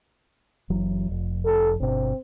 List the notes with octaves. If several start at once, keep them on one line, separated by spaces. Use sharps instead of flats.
F#1 E3 F#3
F1 F2
A4
G1 B2 C4 D4